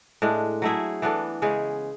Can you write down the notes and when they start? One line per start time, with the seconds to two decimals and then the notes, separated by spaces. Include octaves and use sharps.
0.22 A2 G#3 D4
0.62 F#3 A3 E4 G#4
1.02 E3 B3 D4 A4
1.42 C#3 G#3 C#4 G#4